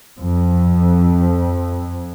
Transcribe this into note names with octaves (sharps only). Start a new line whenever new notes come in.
F2